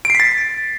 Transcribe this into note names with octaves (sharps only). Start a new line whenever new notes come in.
A6 B6 C7 D7